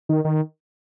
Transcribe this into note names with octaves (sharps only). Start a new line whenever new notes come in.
D#3
D#3